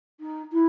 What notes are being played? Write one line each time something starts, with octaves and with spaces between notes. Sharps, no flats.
D#4
E4